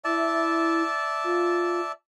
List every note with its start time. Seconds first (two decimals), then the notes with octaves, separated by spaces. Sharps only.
0.04 E4 D5 E5 A5
1.24 F4